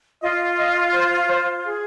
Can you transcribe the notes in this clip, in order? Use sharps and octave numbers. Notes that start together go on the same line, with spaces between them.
F4 D#5
D#5
C5
C5
G#4